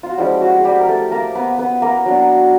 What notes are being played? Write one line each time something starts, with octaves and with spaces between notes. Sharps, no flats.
F4
F#4
F3 G3 G#3 C#4 E4 G4
F#4
G#4
G3 G4
A#4
A3 A4
A#3 A#4
B3 B4
B3 B4
A#3 A#4
F#3 B3 D4